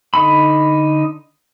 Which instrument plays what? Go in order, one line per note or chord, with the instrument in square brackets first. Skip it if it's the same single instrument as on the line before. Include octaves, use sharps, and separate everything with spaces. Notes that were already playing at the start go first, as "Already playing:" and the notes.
[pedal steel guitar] D3 D#4 B5